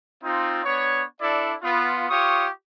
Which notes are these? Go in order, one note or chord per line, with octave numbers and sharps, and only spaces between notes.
C4 D#4 F4
B3 D4 C#5
D4 E4 A4 D5
B3 F4
F4 G4 C#5 C#6 D#6